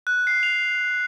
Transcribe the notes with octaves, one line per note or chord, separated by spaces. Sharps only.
F#6
C7
F7